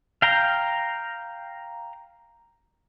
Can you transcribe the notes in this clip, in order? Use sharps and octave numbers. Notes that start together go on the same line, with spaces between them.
F5 G5 A#5